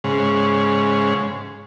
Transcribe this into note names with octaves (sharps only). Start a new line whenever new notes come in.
G#2 C#3